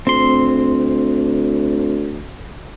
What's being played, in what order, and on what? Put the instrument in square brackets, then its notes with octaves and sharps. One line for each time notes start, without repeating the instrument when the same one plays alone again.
[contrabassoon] D2 [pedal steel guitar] C4 C6